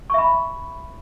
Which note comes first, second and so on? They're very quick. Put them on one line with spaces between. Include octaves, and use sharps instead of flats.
C#6 E5 B5